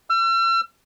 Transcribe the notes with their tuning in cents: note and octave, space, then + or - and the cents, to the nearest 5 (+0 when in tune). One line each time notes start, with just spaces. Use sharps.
E6 +45